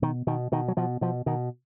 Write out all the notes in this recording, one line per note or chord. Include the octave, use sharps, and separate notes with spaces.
B2 D#3
B2 D#3
B2 D#3
F#3
B2 F3
B2 F3
B2 D#3